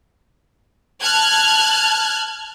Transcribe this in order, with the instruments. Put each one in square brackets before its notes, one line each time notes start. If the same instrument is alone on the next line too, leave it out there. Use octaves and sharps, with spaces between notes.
[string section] A5 F6 F#6 G#6